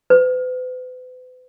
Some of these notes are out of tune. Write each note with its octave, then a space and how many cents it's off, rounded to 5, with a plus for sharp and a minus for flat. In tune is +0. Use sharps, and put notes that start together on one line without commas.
B4 +40